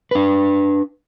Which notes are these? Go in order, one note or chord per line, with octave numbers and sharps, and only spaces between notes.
D4 B4